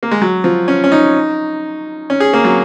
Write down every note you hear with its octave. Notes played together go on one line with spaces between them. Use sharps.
A#3
G#3
F#3
F3
C#4
C#4
D#4
C#4
G#4
A#3
F#3